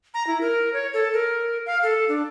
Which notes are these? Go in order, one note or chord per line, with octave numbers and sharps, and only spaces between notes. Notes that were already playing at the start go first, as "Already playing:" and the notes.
A#5
E4
A#4
C#5
A4
A#4
F5
A4
D4